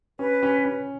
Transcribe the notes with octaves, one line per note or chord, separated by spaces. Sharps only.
C#4 B4
C#4
C#4